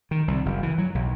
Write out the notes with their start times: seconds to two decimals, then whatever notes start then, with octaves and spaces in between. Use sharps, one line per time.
0.11 D#3
0.28 C2
0.46 F#1
0.63 E3
0.78 F#3
0.95 B1